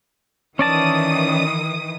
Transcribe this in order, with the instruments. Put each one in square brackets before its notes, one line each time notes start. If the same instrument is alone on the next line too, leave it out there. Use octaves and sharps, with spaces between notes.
[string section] D#3 E3 D#6 [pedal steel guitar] C#4 D5 A5